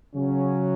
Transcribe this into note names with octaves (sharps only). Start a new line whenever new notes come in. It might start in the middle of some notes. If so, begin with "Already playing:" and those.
C#3 F#3 C#4